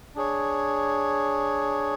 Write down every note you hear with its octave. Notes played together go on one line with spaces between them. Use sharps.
D4 G#4 C#5